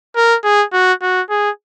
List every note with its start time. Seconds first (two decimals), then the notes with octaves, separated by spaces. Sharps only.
0.16 A#4
0.44 G#4
0.73 F#4
1.02 F#4
1.30 G#4